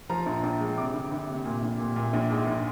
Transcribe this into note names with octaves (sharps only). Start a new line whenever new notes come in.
F3 A#5
A#1
A#1
G#3
C3 D6
D2
D2
C3
A#2
A#1
A#2
A#2
A#1
G#2
A#1